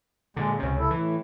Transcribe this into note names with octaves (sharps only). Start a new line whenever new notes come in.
A#2 D3 G#3
C#2 C3 C#4
E4 A4
A2 E3